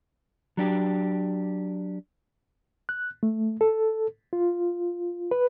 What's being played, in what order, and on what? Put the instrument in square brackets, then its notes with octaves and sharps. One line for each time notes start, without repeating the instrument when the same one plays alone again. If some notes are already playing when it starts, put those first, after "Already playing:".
[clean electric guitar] F#3 D4 G4
[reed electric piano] F#6
A3
A4
F4
B4